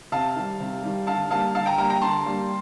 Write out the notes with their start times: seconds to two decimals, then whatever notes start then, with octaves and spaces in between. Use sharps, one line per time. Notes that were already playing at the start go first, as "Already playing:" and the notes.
0.12 C3 F5 A5
0.36 D#3 G3
0.60 C3
0.83 D#3 G3
1.07 D3 F5 A5
1.31 G3 A#3 F5 A5
1.55 D3 F5 A5
1.66 G5 A#5
1.78 G3 A#3 G5 A#5
1.90 G5 A#5
2.02 D3 A5 C6
2.25 G3 A#3